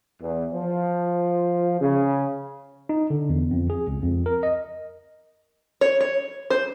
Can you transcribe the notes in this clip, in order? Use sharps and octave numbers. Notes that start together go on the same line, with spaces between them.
E2
F3
C#3
D#4
D3
E2
F2
G#4
C#2
F2
A#4
D#5
C#5
C#5
C5